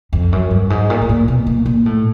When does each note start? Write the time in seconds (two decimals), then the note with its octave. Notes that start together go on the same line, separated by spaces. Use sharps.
0.13 F2
0.32 F#2
0.51 G2
0.70 G#2
0.90 A#2
1.02 A2
1.09 A#2
1.28 B2
1.47 A#2
1.66 A#2
1.86 A2